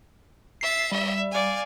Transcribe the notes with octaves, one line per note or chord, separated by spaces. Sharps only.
E5 A6 C7
G3 E5
D5 F5 G#5